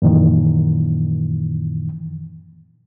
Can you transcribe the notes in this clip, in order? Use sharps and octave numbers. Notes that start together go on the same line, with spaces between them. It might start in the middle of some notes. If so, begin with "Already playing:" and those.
F#2 A#2 D#3 E3